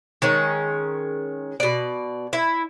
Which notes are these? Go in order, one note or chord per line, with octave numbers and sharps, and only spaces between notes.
D#3 G#3 C#4
B2 D5
E4